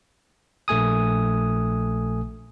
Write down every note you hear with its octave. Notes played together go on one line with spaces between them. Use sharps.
A#1 A3 G#5 D#6